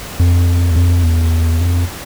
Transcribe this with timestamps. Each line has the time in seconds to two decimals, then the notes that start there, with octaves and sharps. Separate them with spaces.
0.19 F2
0.71 E2
0.76 F2
1.04 E2
1.61 F2